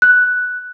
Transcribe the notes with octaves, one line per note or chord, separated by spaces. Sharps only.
F#6